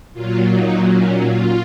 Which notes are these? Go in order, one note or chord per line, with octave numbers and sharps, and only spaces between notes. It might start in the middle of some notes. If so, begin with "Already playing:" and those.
A#2 F#3 F4
D#4
C#4
F4